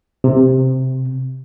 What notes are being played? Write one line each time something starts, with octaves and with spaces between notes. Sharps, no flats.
C3